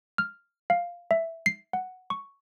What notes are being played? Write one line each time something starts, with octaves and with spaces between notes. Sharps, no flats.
F6
F5
E5
C7
F#5
C#6